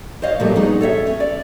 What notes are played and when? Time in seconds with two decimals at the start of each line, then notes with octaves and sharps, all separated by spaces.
0.22 C5 C#5 D#5 F5
0.40 A#2 F3 G3 A3
0.56 B3 C#4 D#4 G#4
0.81 A4 C#5 D#5 E5
1.07 C#4
1.20 D5